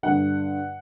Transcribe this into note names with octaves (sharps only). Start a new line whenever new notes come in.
G2 D3 F#5